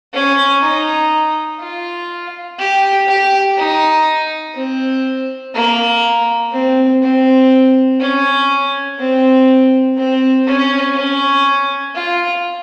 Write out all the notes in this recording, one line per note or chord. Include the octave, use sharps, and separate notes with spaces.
C#4
D#4
F4
G4
G4
D#4
C4
A#3
C4
C4
C#4
C4
C4
C#4
C#4
F4